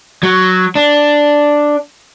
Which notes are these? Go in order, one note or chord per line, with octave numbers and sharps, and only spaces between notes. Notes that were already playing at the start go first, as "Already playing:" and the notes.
F#3
D4